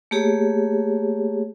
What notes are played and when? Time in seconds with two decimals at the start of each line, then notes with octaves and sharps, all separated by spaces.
0.11 A3 A#3 G4 G#4 C#5